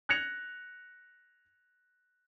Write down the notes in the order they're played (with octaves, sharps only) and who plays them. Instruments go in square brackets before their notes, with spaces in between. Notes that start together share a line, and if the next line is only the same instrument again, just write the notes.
[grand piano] F#6 G#6 A#6 C#7 F7